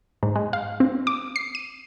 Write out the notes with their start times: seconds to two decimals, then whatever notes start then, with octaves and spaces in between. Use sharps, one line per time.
0.23 G#2
0.36 G#3
0.53 F5
0.80 C4
1.07 D6
1.36 C7
1.55 D#7